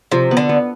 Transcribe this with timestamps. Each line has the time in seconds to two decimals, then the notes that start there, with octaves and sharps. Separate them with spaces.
0.12 C3 F3
0.31 B3
0.37 D3
0.49 B3